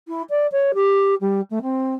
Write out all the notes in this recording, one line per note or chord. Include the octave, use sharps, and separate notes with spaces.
E4
D5
C#5
G4
G3
A3
C4